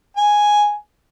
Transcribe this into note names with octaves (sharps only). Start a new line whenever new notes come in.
G#5